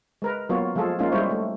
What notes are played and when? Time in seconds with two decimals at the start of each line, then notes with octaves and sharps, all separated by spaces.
0.22 G#3 A#4 B4
0.49 F#3 A#3 B3 F4 C#5
0.75 F3 G#3 F4 G#4 A4
0.99 G#3 A#3 C#4 D#4 F4
1.12 G3 G#3 E4 C5 C#5
1.30 A3